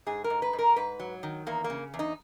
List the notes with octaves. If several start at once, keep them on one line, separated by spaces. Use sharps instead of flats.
G#2 G#4
A#4
G#2
B4
G#2
A#4
G#2 B4
F#3
D#3
E2 A#3
A#3
C#3
E2
D#4